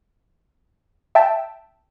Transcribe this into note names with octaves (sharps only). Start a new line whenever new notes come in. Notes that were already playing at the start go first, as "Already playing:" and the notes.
E5 G5 A5